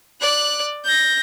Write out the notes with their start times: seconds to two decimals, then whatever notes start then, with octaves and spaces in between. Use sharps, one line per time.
0.21 D5 F#6
0.84 G6 A#6